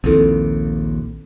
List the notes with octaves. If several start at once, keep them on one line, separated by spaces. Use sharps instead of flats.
A#1 D#2 C4 E4 A4